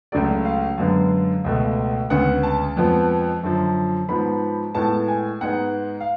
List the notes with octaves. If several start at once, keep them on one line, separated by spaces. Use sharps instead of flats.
C#2 C#3 F#3 A3 D5
F5
F#2 D3 G#3 B3
C#2 B2 A3
D2 C#3 G#3 B3 F#5
A5
F2 F3 G#3 B3
F#2 D3 F3
G#2 F3 B3 B5
A2 G#3 B3 A5
G#5
G#2 G#3 B3 F#5
F5